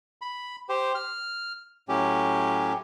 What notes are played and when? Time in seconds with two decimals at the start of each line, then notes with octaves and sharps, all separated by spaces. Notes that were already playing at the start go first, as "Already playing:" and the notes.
0.22 B5
0.69 G4 C5
0.95 F6
1.89 A2 F#3 C#4 G4